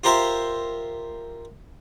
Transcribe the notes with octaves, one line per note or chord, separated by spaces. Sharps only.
F4 G4 A#4 C5 E5